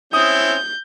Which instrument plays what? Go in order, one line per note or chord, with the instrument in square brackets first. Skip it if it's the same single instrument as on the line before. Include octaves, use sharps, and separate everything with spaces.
[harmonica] C4 C#4 E4 [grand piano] D#6 [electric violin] G6